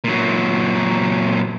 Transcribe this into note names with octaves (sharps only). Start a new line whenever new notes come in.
A#2 F#3